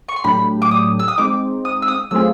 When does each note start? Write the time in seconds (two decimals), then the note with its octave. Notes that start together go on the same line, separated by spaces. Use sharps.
0.08 C#6
0.16 C6
0.24 A2 F#3 A3 D4 G4 B5
0.62 D6
0.71 D#6
0.99 E6
1.08 D#6
1.18 G#3 C4 D#4 D6
1.65 D#6
1.82 E6
1.88 D#6
2.11 F#3 A3 C4 F4 G#4 E6